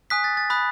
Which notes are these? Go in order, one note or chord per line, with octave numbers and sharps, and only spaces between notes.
G#5 D#6 F#6 B6
A6
A6
B5 D#6 F#6